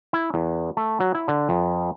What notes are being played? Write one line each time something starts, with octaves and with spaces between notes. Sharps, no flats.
E4
E2
A3
F#3
E4
D3
F2